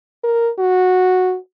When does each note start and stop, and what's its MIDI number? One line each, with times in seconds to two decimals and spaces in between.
0.24 0.50 70
0.59 1.37 66